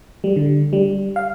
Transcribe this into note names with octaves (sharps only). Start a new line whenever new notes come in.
G3
D3
G3
F5